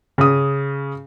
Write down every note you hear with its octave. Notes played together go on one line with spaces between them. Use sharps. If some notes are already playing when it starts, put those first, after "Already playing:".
C#3 D#6